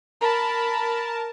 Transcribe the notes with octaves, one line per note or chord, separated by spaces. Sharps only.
A#4 A5 B5